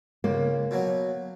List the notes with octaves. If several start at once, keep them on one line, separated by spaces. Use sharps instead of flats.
C#2 A#3
B2 F#3